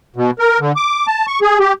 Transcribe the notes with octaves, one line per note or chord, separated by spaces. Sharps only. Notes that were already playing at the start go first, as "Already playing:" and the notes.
B2
A#4
D3
D6
A5
C#6
G#4
G4